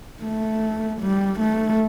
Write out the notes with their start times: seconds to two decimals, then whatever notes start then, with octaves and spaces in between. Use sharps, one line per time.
0.23 A3
1.01 G3
1.39 A3